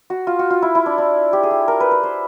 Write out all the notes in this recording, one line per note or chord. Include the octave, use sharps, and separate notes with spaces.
F#4
F4
F#4
F4
E4
E4
D4
D4
G4
G#4
G4
A#4
B4
B4
C5